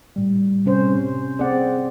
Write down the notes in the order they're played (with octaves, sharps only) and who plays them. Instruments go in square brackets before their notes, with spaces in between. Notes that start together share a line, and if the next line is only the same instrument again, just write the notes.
[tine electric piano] A2 G3
[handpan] C3 C#4 C5
[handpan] C4 D5 [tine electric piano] G#4 F#5